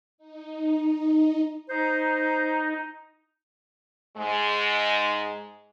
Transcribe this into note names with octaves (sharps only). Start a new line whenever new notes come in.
D#4
D#4
D#4 C5
G#2 G#3